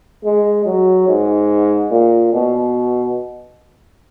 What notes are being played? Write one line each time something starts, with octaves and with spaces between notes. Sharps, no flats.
G#3
F#3
G#2
A#2
B2